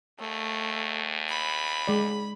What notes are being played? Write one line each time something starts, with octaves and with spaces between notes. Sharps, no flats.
D#2 A3
B5
G#3 D5